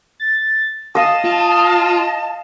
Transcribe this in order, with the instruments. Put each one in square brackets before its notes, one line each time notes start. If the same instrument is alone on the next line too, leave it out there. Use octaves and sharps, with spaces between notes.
[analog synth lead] A6
[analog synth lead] D#5 [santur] F5 D#6 [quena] A5
[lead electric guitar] F4